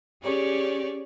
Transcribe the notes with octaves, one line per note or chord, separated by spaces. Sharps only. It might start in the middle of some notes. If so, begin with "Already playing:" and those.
C#4 G4 G#4 C#5 D5